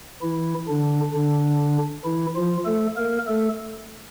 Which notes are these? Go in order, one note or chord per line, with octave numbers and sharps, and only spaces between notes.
E3 E4
D3 D4
D3 D4
E3 E4
F3 F4
A3 A4
A#3 A#4
A3 A4